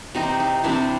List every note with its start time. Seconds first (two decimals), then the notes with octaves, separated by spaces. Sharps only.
0.15 C3 E3 G3 C4 D#4
0.40 D#4
0.64 C3 E3 G3 C4 D4 E4